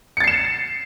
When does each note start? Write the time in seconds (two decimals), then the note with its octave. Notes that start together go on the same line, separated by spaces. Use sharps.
0.17 C#7
0.20 A6
0.24 C7
0.27 E7